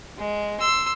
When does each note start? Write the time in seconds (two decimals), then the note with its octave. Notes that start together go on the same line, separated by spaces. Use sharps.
0.19 G#3
0.60 C6 E6